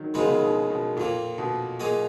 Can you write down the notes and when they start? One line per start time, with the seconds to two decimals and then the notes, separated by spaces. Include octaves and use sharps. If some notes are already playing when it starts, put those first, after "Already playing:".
Already playing: D#3 F#3
0.14 F#2 C#3 F3 G#3 B3 D#4
0.22 D#3
0.29 C#3
0.42 B2
0.70 B2
0.97 F2 A#2 F3 A#3
1.38 B2
1.80 F#3 A#3 F4 G#4 D#5